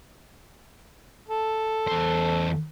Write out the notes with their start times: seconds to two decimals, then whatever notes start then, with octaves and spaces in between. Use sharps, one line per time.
1.28 A4
1.87 E2 C5